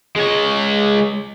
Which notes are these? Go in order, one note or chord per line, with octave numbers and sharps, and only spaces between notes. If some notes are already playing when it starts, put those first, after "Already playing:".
G#3 C#5